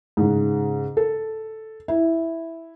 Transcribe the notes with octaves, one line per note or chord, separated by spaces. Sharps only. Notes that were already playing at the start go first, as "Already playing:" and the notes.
G#2 C#3
A4
E4